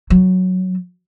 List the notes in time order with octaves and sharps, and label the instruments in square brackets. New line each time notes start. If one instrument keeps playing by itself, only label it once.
[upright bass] F#3